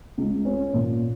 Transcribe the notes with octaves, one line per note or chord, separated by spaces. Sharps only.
C#2
C#4
A#2